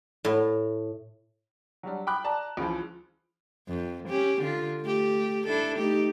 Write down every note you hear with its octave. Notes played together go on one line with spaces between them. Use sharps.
A2
F#3 G3 D4
G5 B5 D6 F#6
D5 A5 A#5
C#2 C#3 E3 F3
F2
C#4 G4
D3 F4
A3 G4
D4 E4 A4
A3 D#4 G4